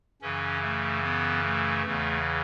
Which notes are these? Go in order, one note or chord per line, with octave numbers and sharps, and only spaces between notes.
F#2 C#3 E3 C#4
A3
B3
A3
E2 C#3 E3